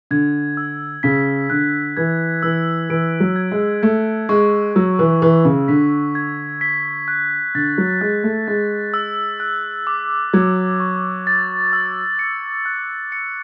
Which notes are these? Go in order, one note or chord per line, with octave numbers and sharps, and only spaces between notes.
D3 G#6
E6
C#3 B6
D3 F#6
E3 G#6
E3 E6
E3 D7
F#3
G#6
G#3
A3 G#6
G#3 C#6
F#3 E6
E3
E3 C#6
C#3
D3 B6
G#6
B6
F#6
D3 A6
F#3
G#3 F#6
A3
G#3 A6
E6
F#6
D6
F#3 G#6
C#6
A6
E6
C#7
F#6
C#7